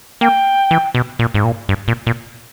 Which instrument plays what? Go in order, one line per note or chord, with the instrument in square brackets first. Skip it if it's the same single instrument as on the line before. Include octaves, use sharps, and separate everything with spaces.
[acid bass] A#3 [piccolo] G5
[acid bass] E3
B2
A#2
G#2
A#2
G2
A#2
A#2